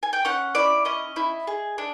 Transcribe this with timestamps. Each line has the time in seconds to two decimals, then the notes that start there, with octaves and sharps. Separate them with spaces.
0.03 G#5
0.13 G5
0.25 C#4 F#5
0.55 E4 D5
0.85 C#4 D#5
1.16 E4
1.47 G#4
1.78 D4